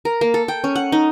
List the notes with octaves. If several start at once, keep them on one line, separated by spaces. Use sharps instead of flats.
A#4
A#3
A4
G5
C#4
F#5
D#4